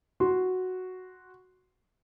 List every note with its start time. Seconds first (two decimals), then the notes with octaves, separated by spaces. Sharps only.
0.20 F#4 C6